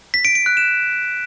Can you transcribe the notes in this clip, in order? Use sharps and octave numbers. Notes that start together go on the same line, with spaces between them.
B6
D7
D7
F#6
E7